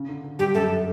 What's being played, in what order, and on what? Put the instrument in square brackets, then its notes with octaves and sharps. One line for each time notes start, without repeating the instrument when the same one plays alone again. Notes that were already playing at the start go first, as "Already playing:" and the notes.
Already playing: [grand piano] C#3
D3
D3
[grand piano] G2 [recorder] G4
[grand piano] F#2 [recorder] A4